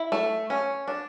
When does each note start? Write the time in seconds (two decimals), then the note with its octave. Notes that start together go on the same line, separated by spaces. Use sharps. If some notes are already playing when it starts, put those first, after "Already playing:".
Already playing: E4
0.12 A3
0.50 C#4
0.88 D4